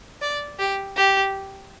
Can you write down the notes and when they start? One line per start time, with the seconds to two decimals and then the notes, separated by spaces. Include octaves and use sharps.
0.21 D5
0.59 G4
0.96 G4